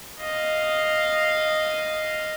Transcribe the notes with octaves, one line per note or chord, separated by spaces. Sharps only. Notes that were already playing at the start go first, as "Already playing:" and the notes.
D#5 F5